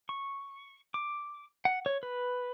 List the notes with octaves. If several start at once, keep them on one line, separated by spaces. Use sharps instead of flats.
C#6
D6
F#5
C#5
B4